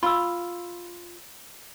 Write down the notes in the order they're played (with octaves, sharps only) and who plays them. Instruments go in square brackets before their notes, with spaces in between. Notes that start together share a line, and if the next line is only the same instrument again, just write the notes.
[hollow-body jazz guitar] F4 [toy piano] B5 E6